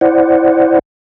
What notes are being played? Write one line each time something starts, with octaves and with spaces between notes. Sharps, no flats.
E4 C5 D5 F#5